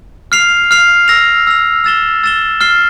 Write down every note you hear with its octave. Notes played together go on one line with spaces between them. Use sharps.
F6 C7 F7
F6 C7 F7
E6 A#6 F7
E6 A#6 F7
E6 A6 E7 G7
E6 A6 E7 G7
F6 C7 G7